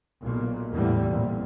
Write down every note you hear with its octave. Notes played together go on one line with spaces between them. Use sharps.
B1 A#2
E2 A2 D3 G3 A3
A1 F2 A#2